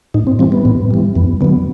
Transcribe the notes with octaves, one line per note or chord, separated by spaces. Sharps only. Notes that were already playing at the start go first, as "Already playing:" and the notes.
A2 D#4
C4
E3 G3 C4
B3
A2
E3 G3
F2 B3
D3 F#3 B3